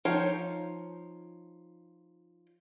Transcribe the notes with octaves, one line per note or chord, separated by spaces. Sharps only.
F3 D#4 C#5 G5